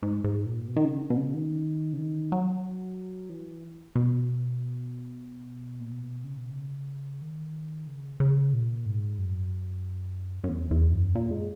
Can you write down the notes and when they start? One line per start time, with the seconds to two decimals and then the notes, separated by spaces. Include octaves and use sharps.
0.03 G#2
0.24 G#2
0.46 A#2
0.68 B2
0.76 D#3
0.85 C#3
1.10 B2
1.17 C#3
1.34 D#3
1.93 C#3
1.99 D#3
2.32 F#3
3.30 E3
3.95 B2
5.80 A#2
5.92 B2
6.24 C#3
6.37 B2
6.51 C#3
7.22 D#3
7.87 C#3
8.20 C#3
8.53 A#2
8.86 G#2
9.19 F#2
10.44 F#2
10.49 E2
10.71 E2
10.93 F#2
11.15 A#2
11.31 G#3